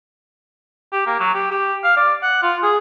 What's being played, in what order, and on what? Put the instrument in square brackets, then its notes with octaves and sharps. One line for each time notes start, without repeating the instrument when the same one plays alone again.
[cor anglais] G4
A#3
F#3
G4
G4
F5
D5
F#5
F4
G#4